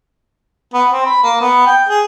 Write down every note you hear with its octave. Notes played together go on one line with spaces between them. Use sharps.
B3
C4
B5
A#3
B3
G5
G#4